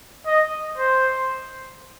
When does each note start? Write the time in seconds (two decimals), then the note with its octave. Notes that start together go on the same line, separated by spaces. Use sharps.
0.27 D#5
0.78 C5